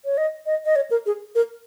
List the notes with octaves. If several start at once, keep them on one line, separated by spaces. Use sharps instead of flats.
C#5
D#5
D#5
D#5
C#5
A#4
G#4
A#4